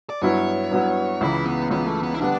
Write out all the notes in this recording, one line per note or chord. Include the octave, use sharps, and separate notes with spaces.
D5
G2 F#3 B3 E4 C#5
G2 F#3 B3 E4
C#2 C#3 E3 E4
B3
C#2 C#3 E3 B3
A3
B3
E4
D3 G3 B3 D4